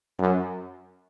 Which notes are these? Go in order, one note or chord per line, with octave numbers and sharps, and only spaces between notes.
F#2